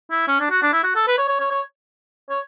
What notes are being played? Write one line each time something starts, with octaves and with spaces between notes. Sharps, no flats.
E4
C#4
D4
F#4
D4
E4
F#4
A4
B4
C#5
C#5
C#5
C#5
C#5